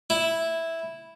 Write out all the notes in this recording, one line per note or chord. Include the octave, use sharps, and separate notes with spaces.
E4